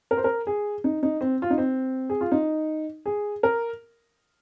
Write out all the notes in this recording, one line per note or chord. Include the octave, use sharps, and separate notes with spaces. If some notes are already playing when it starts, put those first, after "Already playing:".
A#4
C5
A#4
G#4
D#4
D#4
C4
F4
D#4
C4
G#4
F4
D#4
G#4
A#4